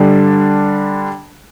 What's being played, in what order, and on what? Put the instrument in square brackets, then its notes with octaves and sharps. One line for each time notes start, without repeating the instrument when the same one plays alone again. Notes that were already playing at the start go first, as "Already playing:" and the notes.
Already playing: [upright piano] D3 G3 D4